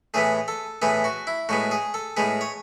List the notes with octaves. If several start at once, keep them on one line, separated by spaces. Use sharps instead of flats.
A2 E3 B3 G#4
A4
A2 E3 B3 G#4
F#4
E4
A2 G#3 B3 F#4
G#4
A4
A2 G#3 B3 G#4
C#5